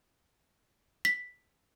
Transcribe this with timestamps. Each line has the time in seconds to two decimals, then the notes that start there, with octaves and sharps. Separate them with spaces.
1.05 B6